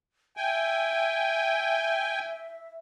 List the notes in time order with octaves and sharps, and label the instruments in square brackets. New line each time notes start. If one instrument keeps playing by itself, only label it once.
[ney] E5 [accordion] G5 G#5